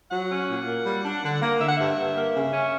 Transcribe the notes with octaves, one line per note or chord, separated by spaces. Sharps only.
F#3 F#5
C#4
A#2
A#3
G3
D4
D3
A#3
D3 E5
F#5
G2 E5
G2
A#3
C#3
C#4